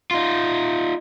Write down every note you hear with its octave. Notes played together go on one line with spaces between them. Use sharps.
D#4 F4